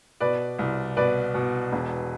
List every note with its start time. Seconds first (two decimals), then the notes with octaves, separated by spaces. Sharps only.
0.20 B2 B4 D5
0.59 C2
0.97 B2 B4 D5
1.34 B2
1.72 E1